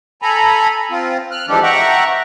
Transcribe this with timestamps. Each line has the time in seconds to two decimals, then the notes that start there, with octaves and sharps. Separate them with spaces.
0.22 A4 G#5 A#5 B5
0.91 C4 F4
1.31 F6 F#6
1.49 E3 F3 G#3 D4 G4 A4
1.63 E5 F#5 G5 A#5 C#6 F#6